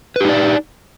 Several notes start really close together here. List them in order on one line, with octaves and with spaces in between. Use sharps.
B4 G4 D#4 D5